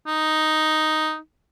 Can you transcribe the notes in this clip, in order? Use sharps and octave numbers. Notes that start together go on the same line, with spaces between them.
D#4